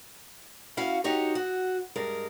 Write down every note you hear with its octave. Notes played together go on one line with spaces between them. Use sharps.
C#4 E4 F#4 F5 F#5
D#4 F#4 G4 C#5
F#4
G2 G#3 A#4